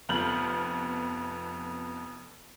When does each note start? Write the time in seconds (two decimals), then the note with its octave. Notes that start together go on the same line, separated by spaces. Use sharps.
0.09 F1 F2 B3 F6 G6 F#7